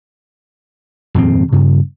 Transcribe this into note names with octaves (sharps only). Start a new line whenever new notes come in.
D#1 F2 G#2 C4
G2 C#3